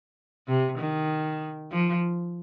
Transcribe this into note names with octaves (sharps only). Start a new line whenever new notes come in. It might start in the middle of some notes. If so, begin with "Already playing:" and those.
C3
D#3
F3